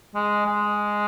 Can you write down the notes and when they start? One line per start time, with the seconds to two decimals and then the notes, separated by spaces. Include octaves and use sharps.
0.15 G#3
0.45 G#3